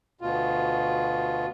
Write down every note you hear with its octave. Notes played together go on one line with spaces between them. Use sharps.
D2 B2 F4